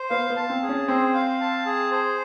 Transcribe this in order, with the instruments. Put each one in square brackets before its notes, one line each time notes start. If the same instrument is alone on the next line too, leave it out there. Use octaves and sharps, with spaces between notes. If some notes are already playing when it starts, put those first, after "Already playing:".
Already playing: [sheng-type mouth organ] C5
[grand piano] B3 [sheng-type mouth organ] F5
[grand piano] B3
[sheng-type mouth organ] A5
[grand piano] C4
[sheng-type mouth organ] G#4
[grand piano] C#4
[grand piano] C4 [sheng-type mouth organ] C5
[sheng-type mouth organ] F5
A5
G#4
C5